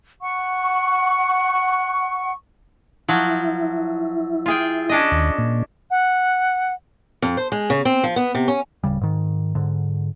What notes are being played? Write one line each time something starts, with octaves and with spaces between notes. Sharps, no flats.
F#5 C#6
F3 F#3 E4
F4 G#4 G5
C#4 D4 D#5
D#2
A#2
F#5
F2
C5
G#3
C#3
C4
F3
B3
C3
C#4
D1 D#2 C#3 G3
G#2 D#3
G#2 D3